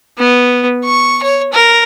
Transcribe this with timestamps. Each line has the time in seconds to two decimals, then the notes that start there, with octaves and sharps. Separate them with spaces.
0.18 B3
0.85 C#6
1.23 C#5
1.53 A#4